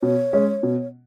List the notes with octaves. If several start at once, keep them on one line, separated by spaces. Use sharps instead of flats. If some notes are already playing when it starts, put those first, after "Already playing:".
B2 C#5
G#3 C#4
B2